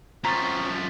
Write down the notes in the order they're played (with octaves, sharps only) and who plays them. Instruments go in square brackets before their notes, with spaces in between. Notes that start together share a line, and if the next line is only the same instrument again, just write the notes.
[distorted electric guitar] F#2 F3 [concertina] C4 C#4 [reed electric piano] A#5 [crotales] A6 B6